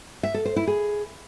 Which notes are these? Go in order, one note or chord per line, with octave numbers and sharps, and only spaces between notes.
E5
A4
C5
E4
G#4